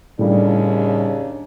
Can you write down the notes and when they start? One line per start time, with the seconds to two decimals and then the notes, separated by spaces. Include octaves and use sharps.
0.19 D#2 A2 C#3 G3 D4